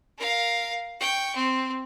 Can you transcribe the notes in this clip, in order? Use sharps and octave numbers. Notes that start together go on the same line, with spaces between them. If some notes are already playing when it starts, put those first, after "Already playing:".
A#4 F5
G5 C#6
C4